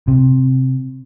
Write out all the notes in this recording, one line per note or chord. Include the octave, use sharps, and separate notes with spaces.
C3